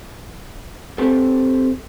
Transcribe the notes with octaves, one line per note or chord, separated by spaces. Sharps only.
C4 G4 A4